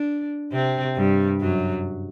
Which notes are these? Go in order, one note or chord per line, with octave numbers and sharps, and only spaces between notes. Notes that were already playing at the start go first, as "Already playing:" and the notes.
Already playing: D4
C3 C4
G2 G3
F#2 F#3